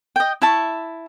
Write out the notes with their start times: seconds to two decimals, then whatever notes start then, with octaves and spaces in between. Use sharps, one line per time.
0.16 D#5 G5
0.42 E4 E5 A5 C#6